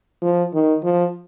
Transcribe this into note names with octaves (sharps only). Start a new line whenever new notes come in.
F3
D#3
F3